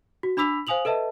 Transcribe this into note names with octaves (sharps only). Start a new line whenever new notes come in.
F#4
D4 B5 D6 E6 B6 F7
C5 F5 G#5 D#6 F7 F#7
A4 B4 D#5 E5 A5